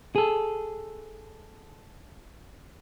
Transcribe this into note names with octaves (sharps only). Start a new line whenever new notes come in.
G#4 A4